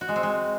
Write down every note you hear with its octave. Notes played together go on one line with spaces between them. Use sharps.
F#4
G#3
C4
G#3